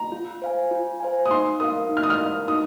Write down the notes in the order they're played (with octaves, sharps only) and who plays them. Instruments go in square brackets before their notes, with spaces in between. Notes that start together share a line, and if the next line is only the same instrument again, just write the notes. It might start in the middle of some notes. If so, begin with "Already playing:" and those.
Already playing: [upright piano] A#5
[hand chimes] F4
C5 F5 G#5
F4
C5 F5 G#5
[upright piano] D#6
[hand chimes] D#4 [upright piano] C6
[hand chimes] A#4 F5 [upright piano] D#6
[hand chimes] D#4
[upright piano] F6
D#6
F6
[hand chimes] A#4 F5
[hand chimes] D#4 [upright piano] D#6